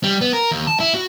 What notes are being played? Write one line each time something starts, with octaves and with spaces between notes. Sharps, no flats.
G3
B3
A#4
D#2
A5
E4
F#4